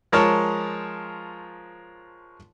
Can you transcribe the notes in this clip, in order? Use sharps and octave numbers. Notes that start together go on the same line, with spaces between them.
F3 G#3 A#4 C#5 A5 F6